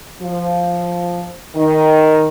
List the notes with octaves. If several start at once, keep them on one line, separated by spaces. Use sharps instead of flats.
F3
D#3